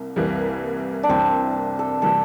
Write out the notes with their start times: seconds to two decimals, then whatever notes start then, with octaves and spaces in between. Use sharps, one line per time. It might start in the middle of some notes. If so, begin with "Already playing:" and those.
Already playing: C2 C3 A#3
0.16 C2 C3 E3 G3 A#3
1.03 D4
1.09 C2 C3 E3 G3 A#3 C4
1.79 A4
2.02 C3 E3 G3 A#3 A4